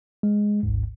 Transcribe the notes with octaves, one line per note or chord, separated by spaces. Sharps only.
G#3
G#1 D2 G#2